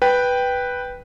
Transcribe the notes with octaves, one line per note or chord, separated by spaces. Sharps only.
B4 G5